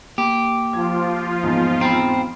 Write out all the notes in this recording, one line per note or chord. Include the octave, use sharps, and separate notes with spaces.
A#3 G4
F3 F4 G#6
E2 G#2 D#4
C4 A#5 B5